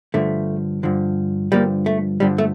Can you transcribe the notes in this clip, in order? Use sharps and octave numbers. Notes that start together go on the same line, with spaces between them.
G2 D3 F3 A3
G2 D3 F3
G2 D3 F3 G3 A#3
A3
G2 D3 F3 G3
A3